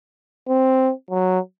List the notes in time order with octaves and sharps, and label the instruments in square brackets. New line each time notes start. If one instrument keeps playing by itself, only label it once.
[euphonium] C4
F#3